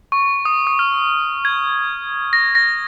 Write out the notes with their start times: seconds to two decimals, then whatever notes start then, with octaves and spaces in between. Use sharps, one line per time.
0.12 C#6
0.45 D#6
0.67 D#6
0.79 F6
1.45 G#6
2.33 A#6
2.55 A#6